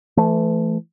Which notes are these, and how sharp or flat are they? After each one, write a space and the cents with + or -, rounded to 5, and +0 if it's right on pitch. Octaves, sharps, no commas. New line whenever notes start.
E3 +30 A3 -5